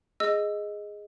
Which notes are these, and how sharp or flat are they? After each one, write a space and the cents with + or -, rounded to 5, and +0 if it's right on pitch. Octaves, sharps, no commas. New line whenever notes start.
G#4 +0 D#5 +0 E6 +15